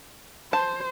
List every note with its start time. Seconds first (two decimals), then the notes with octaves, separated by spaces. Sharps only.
0.53 C5 A5